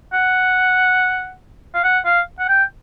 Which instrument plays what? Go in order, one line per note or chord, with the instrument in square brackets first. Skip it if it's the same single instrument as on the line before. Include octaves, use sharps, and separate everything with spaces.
[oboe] F#5
F5
F#5
F5
F#5
G5